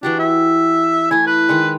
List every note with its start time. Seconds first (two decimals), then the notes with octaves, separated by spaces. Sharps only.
0.03 E3 D4 F#4 G4
0.19 E5
1.11 A3 E4 G#5
1.27 B4
1.49 D#3 G#3